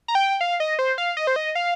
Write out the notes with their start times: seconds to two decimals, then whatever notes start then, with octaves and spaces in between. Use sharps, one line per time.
0.08 A#5
0.15 G5
0.41 F5
0.60 D#5
0.79 C5
0.98 F5
1.17 D#5
1.27 C5
1.36 D#5
1.55 F5